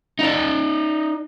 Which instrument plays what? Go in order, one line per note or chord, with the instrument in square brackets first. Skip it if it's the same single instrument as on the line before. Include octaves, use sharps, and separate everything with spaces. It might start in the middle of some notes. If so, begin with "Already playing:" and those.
[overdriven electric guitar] D#4 D5